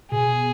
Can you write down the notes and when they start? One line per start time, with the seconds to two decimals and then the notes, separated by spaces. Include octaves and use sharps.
0.11 B2 G#4